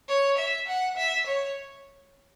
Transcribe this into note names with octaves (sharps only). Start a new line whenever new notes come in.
C#5
E5
F#5
E5
C#5